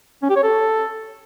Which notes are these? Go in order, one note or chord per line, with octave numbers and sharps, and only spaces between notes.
C#4
G4
C#5
A4